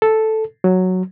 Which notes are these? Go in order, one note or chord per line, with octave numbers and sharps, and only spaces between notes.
A4
F#3